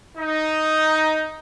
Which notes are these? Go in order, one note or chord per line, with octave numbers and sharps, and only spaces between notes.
D#4